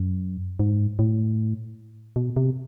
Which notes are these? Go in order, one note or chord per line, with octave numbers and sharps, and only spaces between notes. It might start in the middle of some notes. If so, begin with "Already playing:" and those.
Already playing: F#2
G#2
A2
B2
C3